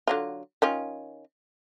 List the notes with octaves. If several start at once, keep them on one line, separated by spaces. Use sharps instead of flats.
D3 F#3 F4
D#3 C#4 F4